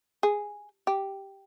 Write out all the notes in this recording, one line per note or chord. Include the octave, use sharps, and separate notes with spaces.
G#4
G4